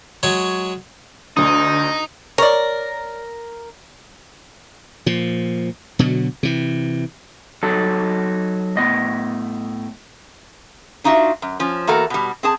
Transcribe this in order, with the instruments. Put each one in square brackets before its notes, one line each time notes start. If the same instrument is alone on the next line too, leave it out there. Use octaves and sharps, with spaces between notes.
[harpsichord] F#3 G#3 C#5
[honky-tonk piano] D2 D3 [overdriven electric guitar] D#4 [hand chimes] D#6
[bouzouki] A#4 [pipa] C#5 D5
[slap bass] A#2 F3
B2 D3 F#3
C3 E3
[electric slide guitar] F#3 D#4 A4
A2 B3 D#5
[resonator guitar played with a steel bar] D4 D#4 F4 F#4 E5
F#2
F3 C#4
E2 A#3 F#4 A4 A#4
B2 G3
C4 G#4 A5